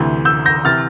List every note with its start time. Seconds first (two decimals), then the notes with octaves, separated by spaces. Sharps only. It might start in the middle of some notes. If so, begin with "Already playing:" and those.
Already playing: D2 C3 E3 G6
0.25 E6 G6
0.46 G6 A#6
0.65 C3 E3 F6 A6